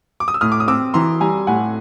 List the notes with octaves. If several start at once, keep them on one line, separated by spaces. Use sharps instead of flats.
D6
D#6
E6
A2 D#6 F6
D6
D#6
C4 D6 E6
E3 A#5 C6
G3 G#5 A#5
A2 F#5 G#5